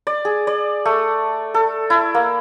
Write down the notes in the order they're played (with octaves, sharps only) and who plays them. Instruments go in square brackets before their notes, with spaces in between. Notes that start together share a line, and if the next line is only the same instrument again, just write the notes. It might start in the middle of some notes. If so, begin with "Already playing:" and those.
[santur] D5
G#4
D5
A3
A4
E4
A#3